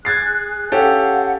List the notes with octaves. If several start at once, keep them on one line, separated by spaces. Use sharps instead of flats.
G#4 F#6 G#6 A6 C7
C#4 G4 A4 F5 F#5